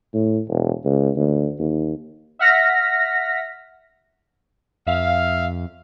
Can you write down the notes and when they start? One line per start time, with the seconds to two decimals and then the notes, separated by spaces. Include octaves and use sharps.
0.14 A2
0.49 E1
0.85 C#2
1.17 D2
1.59 D#2
2.39 E5 F#5 F6 A#6 B6
4.87 F2 E5 F5